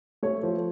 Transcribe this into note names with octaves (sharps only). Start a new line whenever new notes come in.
A3 C#5
F3